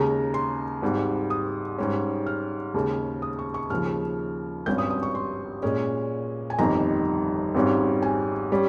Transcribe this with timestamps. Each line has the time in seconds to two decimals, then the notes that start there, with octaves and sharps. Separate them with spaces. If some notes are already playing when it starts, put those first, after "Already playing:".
Already playing: D#2 C#3 G#3 A#5
0.34 C6
0.82 G#1 G#2 G3
1.30 D#6
1.78 G#2 G3 C#4
2.26 F6
2.74 D#2 C#3 G#3
3.22 D#6
3.39 C#6
3.54 C#6
3.70 D#2 C#3 F3 G#3 F6
4.66 G#1 G2 G3 C#4 G6
4.78 D#6
4.90 D#6
5.03 C#6
5.15 C6
5.63 A#2 G#3 C#4
6.50 G#5
6.58 G1 F2 D#3 G3 A#5
7.55 G#1 G#2 G3 C#4
8.02 G#5
8.52 G3 C#4